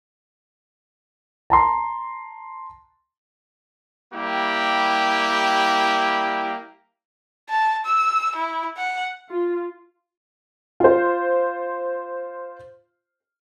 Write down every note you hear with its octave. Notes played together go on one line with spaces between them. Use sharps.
A5 A#5 C6
G3 A#3 E4 G4
A5
E6
E4
F#5
F4
F4 C5